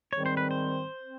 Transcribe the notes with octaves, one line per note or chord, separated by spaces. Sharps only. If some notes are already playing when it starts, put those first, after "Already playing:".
G#2 D#3 G3 C4 C#5
C5
B4
C5
C4